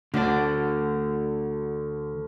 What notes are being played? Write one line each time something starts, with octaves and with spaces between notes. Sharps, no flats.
D2 D3 D5